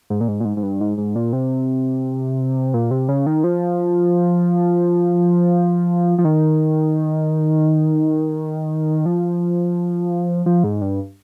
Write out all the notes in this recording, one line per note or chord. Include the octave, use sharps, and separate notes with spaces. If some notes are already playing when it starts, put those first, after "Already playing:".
G#2
A#2
G#2
A#2
G#2
G#2
G2
G#2
G#2
A#2
C3
A#2
C3
C#3
D#3
F3
F3
D#3
F3
F3
G#2
G2